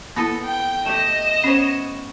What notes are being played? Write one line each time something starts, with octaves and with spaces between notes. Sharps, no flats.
A#3 B3 E4 A4
G5
A3 G4 D#5 E7
B3 C#4 C5 C#5